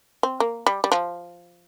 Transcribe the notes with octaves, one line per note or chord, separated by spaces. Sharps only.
C4
A#3
G3
G3
F3